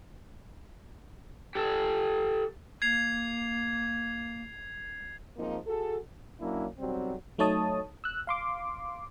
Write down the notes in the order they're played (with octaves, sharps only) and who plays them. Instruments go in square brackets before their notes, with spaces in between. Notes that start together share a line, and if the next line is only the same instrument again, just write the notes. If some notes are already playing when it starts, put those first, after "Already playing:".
[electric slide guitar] G4 A4
[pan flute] A#3 [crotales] G#6 C7 F7
[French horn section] G#2 F3 A#3 C4 D#4
F#4 G#4 A4
[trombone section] F#3 A#3 C#4 D4 E4
B1 F#3 G3 C4
[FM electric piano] F#3 A3 D#4 C#5 A5 D#6
E6 F#6
F5 C6 D6